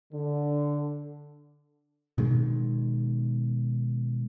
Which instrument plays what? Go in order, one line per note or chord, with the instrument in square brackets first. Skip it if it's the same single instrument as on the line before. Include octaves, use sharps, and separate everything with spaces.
[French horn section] D3
[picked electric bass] B2 D#3 G#3